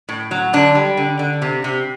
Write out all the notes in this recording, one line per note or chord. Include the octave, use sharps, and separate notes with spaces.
A2
F#3
D3 D4
G3
D3
D3
C3
C3